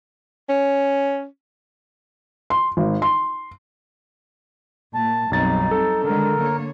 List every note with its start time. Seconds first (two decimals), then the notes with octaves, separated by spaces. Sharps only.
0.49 C#4
2.50 C6
2.77 G#1
3.02 C6
4.95 A#2 A5
5.31 B1 F#2 G3 C4 D#4 A6
5.71 A4
6.05 D3 D#3 G#3 A#4
6.39 D3 A#3 C#5